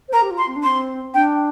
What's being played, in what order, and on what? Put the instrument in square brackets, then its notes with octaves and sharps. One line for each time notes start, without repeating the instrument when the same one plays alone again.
[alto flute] C5
[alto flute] A#4 [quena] A#5
[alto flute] G4
F4
[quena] C6
[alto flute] C4
D4
[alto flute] C4 [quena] C6
[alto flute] D4 [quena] G5